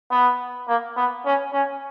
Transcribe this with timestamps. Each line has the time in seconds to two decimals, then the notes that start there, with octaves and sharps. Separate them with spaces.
0.11 B3
0.68 A#3
0.97 B3
1.25 C#4
1.53 C#4